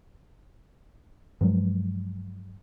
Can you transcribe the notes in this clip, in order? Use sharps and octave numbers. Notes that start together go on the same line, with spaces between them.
G2 F3 F#3 G#3